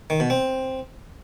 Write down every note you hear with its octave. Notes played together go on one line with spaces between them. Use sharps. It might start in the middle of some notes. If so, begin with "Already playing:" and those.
D#3
B2
C4